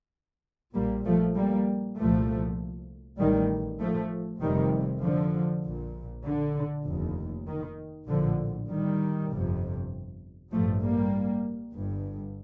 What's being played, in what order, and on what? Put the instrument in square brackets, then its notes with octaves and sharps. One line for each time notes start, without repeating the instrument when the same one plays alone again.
[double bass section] A#1 A#2 G3 A#3
F3 A3
G3 A#3
C2 A#2 F3 A3
A1 A2 D#3 G3
F3 A3
F1 F2 C3 D#3 G3
D3 F3
A#1 A#2
D3
F1 D#2
D#3
A#1 A2 D3 F3
D#3 G3
G1 F2 C3
A1 G2 F3 A3
G3 A#3
G1 G2